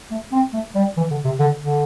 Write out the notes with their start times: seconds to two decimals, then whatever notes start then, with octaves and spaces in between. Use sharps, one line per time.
0.11 A3
0.32 C4
0.53 A3
0.75 G3
0.97 E3
1.10 D3
1.24 C3
1.39 D3
1.61 D3